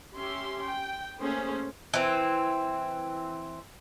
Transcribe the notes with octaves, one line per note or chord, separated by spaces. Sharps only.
C#4 G4 E5 C6
G5
A3 A#3 C#4 G#4 C5
E3 C4